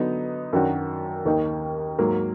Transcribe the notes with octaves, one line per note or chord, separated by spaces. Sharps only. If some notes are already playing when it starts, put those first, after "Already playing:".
Already playing: D3 F#3 B3 D#4
F#2 D#3 F#3 D4 F#4
D#2 D#3 A#3 D#4
G#2 F#3 A#3